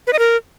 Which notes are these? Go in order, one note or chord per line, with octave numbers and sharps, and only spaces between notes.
B4
D#5
A#4